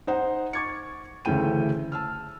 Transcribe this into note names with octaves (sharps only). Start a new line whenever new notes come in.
D#4 C5 F#5
C#6 D6 G#6 A6 C#7
D2 C#3 E3 A3 G5 D#7
A5 E6 F6